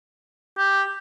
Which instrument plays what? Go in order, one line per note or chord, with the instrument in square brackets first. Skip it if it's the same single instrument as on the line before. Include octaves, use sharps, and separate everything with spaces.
[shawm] G4